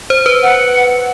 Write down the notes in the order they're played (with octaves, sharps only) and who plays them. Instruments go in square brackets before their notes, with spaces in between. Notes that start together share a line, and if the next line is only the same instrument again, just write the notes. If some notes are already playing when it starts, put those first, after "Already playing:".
[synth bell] C5
B4
[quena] F#5